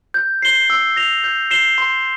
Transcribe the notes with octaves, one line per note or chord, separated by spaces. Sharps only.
G6
C7 G7
E6
A#6 F7
G6
C7 E7 G7
C6